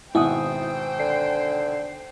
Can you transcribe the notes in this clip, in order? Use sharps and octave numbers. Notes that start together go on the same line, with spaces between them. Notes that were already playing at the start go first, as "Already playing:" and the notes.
G#1 B2 E4 C5 F#5 G5 D#6
D3 C7